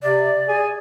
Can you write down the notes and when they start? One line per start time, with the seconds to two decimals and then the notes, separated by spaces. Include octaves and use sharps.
0.03 C3 D5
0.48 G#4 G#5